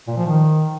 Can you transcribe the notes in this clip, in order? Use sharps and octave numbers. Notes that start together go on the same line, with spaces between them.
A#2
F3
D#3